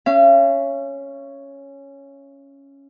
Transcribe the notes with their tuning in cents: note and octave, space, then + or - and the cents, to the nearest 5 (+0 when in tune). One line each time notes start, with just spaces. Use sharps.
C#4 +0 F5 -45